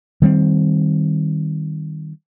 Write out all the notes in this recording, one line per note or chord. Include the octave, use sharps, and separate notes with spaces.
D#3 G3 C4